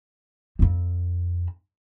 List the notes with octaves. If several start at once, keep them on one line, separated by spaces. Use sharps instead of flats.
F2 C4